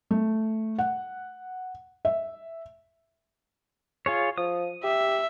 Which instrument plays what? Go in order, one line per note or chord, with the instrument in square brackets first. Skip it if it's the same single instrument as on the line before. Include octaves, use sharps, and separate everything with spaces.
[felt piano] A3
F#5
E5
[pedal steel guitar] F4 G#4 C#5
[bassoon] F3 [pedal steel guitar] D#6
[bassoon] G4 [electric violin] E5